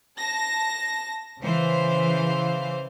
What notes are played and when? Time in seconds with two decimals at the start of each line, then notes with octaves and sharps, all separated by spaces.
0.19 A5 A#6
1.42 C#3 E3 C5 F5